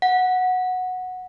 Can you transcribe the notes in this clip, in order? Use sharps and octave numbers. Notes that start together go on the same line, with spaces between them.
F#5